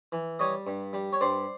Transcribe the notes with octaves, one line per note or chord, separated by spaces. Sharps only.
E3
G3 C#5 D#5
G2
G3
C#5
G2 C5 D5